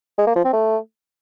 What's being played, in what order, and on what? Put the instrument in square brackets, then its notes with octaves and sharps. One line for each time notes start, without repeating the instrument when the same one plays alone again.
[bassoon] G#3
A#3
F3
C4
A3